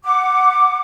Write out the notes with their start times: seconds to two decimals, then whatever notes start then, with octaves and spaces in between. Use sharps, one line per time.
0.05 F#5 D6